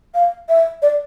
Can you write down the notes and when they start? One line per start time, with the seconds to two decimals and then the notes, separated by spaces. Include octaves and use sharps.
0.15 F5
0.49 E5
0.82 D5